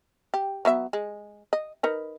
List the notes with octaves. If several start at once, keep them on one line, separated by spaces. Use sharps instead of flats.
G4
F#3 B3 E5
G#3
D#5
D#4 A#4 B4